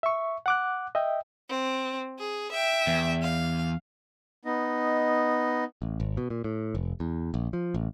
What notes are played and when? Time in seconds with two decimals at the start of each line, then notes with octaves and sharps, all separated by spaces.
0.03 E5 C#6
0.46 F#5 D6 F#6
0.95 D#5 E5 G5
1.49 C4
2.19 G#4
2.52 E5 G5
2.87 E2
3.22 F5
4.45 B3 D#4 D#5
5.82 A1
6.00 G#1
6.17 B2
6.30 A#2
6.44 A2
6.75 F1
7.00 E2
7.34 A#1
7.53 F3
7.74 A1